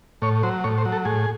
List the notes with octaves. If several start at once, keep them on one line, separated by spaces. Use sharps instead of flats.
A2 C#5
F#3 C5
A2 C#5
C5
F#3
A4
A2 G#4